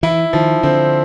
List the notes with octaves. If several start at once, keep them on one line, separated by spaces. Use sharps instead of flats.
E3 E4
D#3 F3
D3 C4